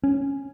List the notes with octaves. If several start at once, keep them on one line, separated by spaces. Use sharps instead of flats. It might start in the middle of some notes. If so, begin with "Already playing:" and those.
C#4